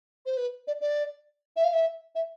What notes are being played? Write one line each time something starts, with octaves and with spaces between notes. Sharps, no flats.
C5
B4
D5
D5
E5
F5
E5
E5